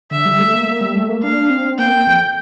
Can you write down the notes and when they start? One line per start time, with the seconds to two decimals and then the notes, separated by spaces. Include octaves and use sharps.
0.11 D3 E5
0.25 G3
0.39 A3
0.53 A#3
0.68 A#3
0.81 G3
0.96 A3
1.09 A#3
1.23 D4 F5
1.50 C4
1.78 A#3 G5
2.07 F2